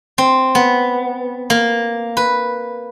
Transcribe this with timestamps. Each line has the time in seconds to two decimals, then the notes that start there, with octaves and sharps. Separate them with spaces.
0.18 C4
0.55 B3
1.50 A#3
2.17 B4